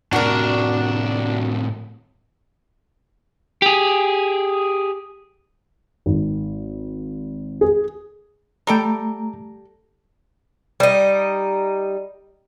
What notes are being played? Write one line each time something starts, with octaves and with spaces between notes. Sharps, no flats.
A2 C3 D4 F#4 A#4 A5
G4 G#4
G#1
G#4
G3 A3 A4 G5 A#5
G3 D#4